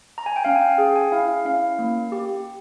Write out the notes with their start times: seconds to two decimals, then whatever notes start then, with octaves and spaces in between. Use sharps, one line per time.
0.18 A#5
0.26 G#5
0.36 G5
0.44 C#4 F5
0.56 G#5
0.61 G5
0.78 G#4
0.96 G#5
1.12 E4 F5
1.45 C#4 F5
1.79 A#3
2.12 G4